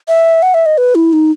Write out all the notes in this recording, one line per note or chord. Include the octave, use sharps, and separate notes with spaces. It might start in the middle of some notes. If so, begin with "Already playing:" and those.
E5
F#5
E5
D#5
B4
E4
D#4